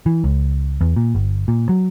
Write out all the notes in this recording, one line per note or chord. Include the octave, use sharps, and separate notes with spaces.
E3
C#2
E2
A#2
G1
A#2
F#3